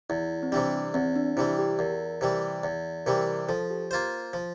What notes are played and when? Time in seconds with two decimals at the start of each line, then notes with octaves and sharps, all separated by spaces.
0.10 E2 E4
0.43 C4
0.52 C3 E3 G3 D4
0.94 E2 C4
1.16 D4
1.37 C3 E3 G3 E4
1.59 G4
1.79 E2 A#4
2.21 C3 E3 G3
2.64 E2
3.06 C3 E3 G3 A#4
3.48 F3 A4
3.70 G4
3.91 A#3 F4 C5
4.33 F3